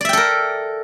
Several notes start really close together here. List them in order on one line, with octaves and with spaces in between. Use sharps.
D5 E5 G5 A4 A#4